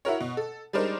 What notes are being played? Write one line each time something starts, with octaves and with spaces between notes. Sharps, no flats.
E4 F#4 A#4 C#5
B2
A4
G3 G#3 D4 D#4 A#4 C5